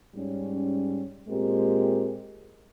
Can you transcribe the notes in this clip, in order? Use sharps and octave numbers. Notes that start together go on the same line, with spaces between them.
G#2 G3 C#4
A#2 G#3 C4 G4 A#4